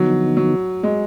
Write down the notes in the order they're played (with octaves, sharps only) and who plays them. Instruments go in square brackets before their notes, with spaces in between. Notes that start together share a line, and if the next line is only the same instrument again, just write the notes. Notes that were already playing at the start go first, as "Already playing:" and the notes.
Already playing: [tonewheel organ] D3 F3 B3 D#4 [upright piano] F#3
[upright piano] F#3
G#3